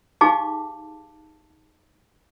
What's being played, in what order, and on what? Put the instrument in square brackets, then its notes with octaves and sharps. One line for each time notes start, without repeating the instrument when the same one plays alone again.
[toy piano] D#4 G4 G#4 F5 A5 D6